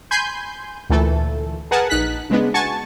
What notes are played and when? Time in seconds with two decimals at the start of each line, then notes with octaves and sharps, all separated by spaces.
0.11 G#5 B5 C6 G6
0.90 D2 A#2 E3 A3 A4
1.71 G#4 A#4 B4 F#5 G#5 A5
1.90 A#1 D#4 F#6 B6
2.30 C#3 G#3 B3 D4
2.54 F#4 G#5 A5 C#6